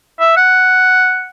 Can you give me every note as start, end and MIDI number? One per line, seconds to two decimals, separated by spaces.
0.20 0.36 76
0.37 1.29 78